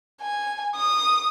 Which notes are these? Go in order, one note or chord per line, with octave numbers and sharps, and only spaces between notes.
G#5
D#6